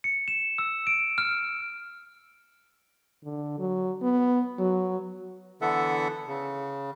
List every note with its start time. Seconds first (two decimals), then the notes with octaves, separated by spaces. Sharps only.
0.04 C#7
0.28 E7
0.58 E6
0.87 D7
1.18 F6
3.25 D3
3.59 F#3
4.03 B3
4.59 F#3
5.62 D3 E3 B3 A4 E5 F#5
6.27 C#3